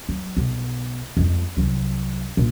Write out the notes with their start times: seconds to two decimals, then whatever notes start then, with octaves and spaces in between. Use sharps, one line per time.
0.09 F#3
0.37 B1 B3
1.17 F2 G#3
1.57 C2 F#3
2.37 A#1